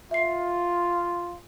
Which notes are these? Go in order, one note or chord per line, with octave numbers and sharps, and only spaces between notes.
F4 E5 C7